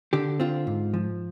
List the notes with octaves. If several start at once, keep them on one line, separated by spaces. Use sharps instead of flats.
D3 G4
C4 F4
G#2
F3